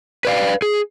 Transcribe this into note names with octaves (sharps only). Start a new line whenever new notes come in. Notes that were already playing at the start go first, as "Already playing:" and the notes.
B4 D5 F5
G#4